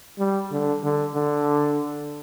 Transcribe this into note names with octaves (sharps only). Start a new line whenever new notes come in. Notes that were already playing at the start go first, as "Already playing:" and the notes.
G3
D3
D3
D3